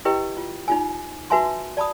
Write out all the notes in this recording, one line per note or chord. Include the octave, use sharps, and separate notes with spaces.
E4 G4 B4 D#5 G5
F4
D#4 F4 G#5
F#4 B4 E5 G#5 A5 C6
D5 A5 B5 D#6